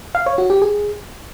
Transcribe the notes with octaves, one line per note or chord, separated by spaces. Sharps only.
F5
C#5
F#4
G4
G#4